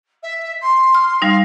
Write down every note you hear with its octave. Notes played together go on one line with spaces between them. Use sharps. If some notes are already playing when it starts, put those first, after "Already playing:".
E5
C6
F6
G3 D#4 F5